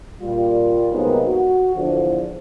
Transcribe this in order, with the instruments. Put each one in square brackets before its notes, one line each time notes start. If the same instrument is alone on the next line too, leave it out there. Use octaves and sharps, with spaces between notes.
[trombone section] A#2 G3 F4
C3 F#3 G#3 A#3 B3 D#4
F#4
E2 D3 F3